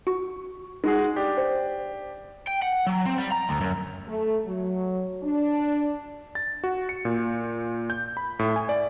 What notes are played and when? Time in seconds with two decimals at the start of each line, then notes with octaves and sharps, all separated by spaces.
0.07 F#4 C#6
0.84 G#3 D#4 F#4 G#4
1.16 D4 G4
1.38 C5
2.47 G5
2.62 F#5
2.87 F#3
3.06 C4
3.18 G3
3.32 A#5
3.49 D2
3.61 F#2
4.08 A3
4.46 F#3
5.23 D4
6.35 A6
6.64 F#4
6.89 C#7
7.05 A#2
7.90 G6
8.17 B5
8.39 A2
8.56 G#5
8.69 D5